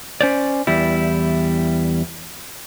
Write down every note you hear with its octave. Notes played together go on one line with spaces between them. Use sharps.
C#4 C5 D5
E2 G3 E4